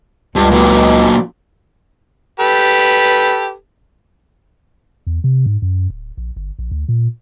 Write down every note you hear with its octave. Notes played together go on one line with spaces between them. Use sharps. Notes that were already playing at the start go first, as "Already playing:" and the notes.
C#2 G2
A#2 F#3
G4 A4 B4
E2
C3
G#2
F#2
D1
A#1
G1
A#1
D2
A#2